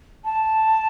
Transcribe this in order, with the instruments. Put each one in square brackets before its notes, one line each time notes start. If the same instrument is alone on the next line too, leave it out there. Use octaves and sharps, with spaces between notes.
[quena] A5